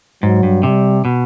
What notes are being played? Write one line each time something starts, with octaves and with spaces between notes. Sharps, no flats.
G#2 F#3
G2
C3 G3
B2